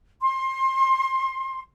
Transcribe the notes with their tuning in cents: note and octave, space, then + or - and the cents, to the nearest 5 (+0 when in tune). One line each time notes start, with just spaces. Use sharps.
C6 +25